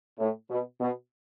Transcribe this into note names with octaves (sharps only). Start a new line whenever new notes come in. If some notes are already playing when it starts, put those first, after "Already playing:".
A2
B2
B2